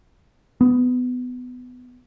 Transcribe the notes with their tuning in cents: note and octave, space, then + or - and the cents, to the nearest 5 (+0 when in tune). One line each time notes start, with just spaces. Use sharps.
B3 +20